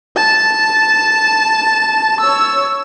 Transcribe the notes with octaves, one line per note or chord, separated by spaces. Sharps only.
A5
C#5 E6